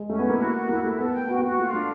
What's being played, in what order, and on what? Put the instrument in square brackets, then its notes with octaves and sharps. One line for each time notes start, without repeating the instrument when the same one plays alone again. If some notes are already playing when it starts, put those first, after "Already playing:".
Already playing: [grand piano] G#3
[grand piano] A3 [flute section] C#4
[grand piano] B3
[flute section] E4
[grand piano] A#3
[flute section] F#4
F#4
[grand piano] A#3 [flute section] E4
[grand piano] A3 [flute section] E4
[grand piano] B3 [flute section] A4
[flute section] G5
[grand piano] B3 [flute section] F#4
[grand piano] A#3
[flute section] F#4
[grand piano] A3 [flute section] F4
[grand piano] A3 [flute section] D4